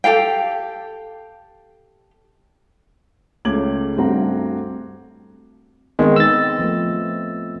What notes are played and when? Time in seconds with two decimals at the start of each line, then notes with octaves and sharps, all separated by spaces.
0.04 G4 A4 F5 G5
3.45 C#2 C#3 A3 D6 G#6 F#7
3.96 G2 A3 C4 F#4 A#5
5.99 D#3 G#3 B3 C4 D#5
6.16 E6 A6
6.59 F3 A3